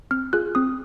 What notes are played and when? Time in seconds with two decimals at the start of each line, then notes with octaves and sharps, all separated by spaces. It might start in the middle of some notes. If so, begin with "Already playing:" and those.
0.11 C4 F6
0.33 F4 G#4 F#6
0.55 C4 D#6